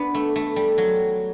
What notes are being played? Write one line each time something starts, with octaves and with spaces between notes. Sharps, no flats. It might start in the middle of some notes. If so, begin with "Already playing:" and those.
Already playing: B3 D4
A3
A3
G3
F#3